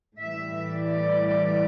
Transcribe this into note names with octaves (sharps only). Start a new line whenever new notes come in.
A2 E3 G3 E5
D5